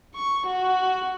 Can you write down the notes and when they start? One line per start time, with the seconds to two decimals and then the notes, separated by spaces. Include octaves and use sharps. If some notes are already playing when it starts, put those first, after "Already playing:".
0.15 C#6
0.46 F#4